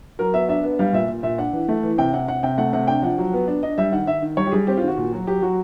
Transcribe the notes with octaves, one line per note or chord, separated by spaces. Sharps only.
F#3 A#4
B3 E5
D4 E5
B3
G3 F5
A#2 E5
A#2
A#2 E5
D4 F#5
E3
A3
E3
C3 G5
C3 F#5
C3 F#5
C3 G5
A3 F#5
C3 F#5
D4 G5
F3 F#5
F#3
B3
D4
D4 D#5
G3 E5
D#3 F#5
D#3 E5
D#3
G3 C#5
G4
G3 G#4
C4 G4
F4
D#3 F#4
A#2
F#3
F#3 G4
F#3 F#4